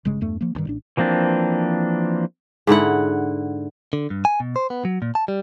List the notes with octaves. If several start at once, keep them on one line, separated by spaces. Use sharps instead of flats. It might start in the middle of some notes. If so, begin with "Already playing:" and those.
G1 C#3 G#3
E2 G2 A3
F3 A#3
D2 G2 D#3
A1 D4
E3 F3 A#3 C4 D4
G#2 D3 E4 F#5
D3
G2
G#5
B2
C5
B3
F#3
A#2
A5
G3